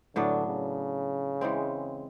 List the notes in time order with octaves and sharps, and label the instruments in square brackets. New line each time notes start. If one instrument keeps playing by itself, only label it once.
[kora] A2 F#3 B3 D4 [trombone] D3
[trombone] C#3
[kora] E3 G#3 C4